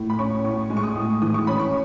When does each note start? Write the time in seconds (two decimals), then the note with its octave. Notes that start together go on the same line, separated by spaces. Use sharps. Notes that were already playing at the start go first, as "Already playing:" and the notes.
Already playing: A2
0.10 B5
0.19 C#4 C#6
0.45 A2 C#6
0.70 G#3
0.77 C#6
0.83 D#6
0.96 A2
1.22 E3 D#6
1.34 C#6
1.47 C#4 B5
1.60 C#6